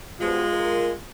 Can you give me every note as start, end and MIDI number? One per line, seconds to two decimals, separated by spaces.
0.21 0.44 43
0.21 0.44 47
0.21 0.95 56
0.21 0.93 65
0.21 0.44 72
0.53 0.91 70